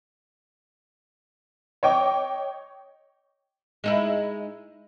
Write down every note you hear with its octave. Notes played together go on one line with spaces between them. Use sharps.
C#5 D#5 G5 D6
G#3 D#4 E4